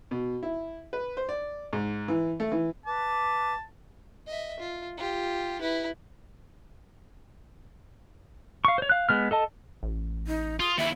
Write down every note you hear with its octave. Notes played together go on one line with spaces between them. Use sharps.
B2
E4
B4
C5
D5
G#2
E3
A3
E3
B4 A5 D6
D#5 E5
F4
F4 G4
E4 B4
F5 C#6
C5 C#5
F5 F#6
G#3 B3 F6
A4 D#5 A5
A1
D#4
F4 D#6
D#2 E4 E5